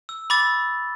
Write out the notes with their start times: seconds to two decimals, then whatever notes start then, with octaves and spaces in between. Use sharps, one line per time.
0.09 E6
0.30 B5 D6 E6 A6